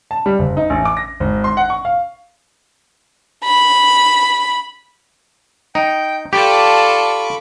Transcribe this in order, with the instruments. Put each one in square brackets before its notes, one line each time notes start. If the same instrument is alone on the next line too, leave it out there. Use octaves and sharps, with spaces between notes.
[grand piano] A5
G3
F#1
D#4
A1
D6
A#6
G#1
C6
F#5
C#6
F5
[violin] B5
[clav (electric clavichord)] D#4 [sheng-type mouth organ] G5
[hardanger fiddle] F4 A4 [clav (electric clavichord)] G4 [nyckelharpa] D5 A5 [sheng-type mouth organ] B5 C#6 D6